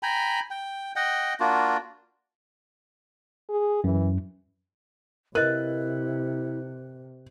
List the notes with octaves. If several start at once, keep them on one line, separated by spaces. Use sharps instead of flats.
G5 G#5 A#5 B5
G5
D#5 F#5 G5
A#3 D4 F4 F#4
G#4
F#2 E3
C3 E4 A#4 B4 D#5 F#6